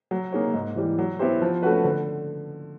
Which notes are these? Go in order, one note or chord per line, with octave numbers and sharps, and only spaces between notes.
F#3
A#3 D#4 G#4 C#5
G#2
E3 G3
F#3
B3 E4 G4 C5
F3
A3 C#4 F#4 B4
D3